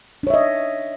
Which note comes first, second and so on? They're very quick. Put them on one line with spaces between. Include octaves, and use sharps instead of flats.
D4 C#5 E5 D#5